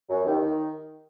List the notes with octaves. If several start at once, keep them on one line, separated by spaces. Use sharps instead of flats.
F#2 F#3
D#2 D#3
D#3